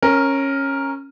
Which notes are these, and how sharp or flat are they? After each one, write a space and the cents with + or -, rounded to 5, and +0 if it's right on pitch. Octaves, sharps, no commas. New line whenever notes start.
C#4 -15 A#4 +0